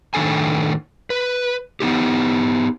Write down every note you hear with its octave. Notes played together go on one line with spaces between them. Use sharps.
A2 D#3 D4 A4 G#5
B4
B3 D#4 G4